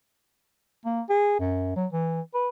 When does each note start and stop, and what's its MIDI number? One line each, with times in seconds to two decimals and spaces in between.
0.85 1.01 58
1.10 1.39 68
1.39 1.76 42
1.76 1.87 54
1.92 2.21 52
2.34 2.49 71